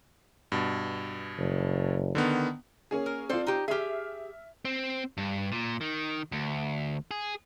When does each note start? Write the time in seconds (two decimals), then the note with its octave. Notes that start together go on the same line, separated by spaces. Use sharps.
0.52 G2 B2
1.38 F#1
2.15 D3 D#3 B3
2.91 A#3 C#4 G#4
3.06 A#4
3.29 C4 F4 A4 C5 D5
3.47 D#4 G4
3.68 G4 G#4 E5 F6
4.65 C4
5.17 G2
5.52 A#2
5.81 D#3
6.32 D2
7.11 G#4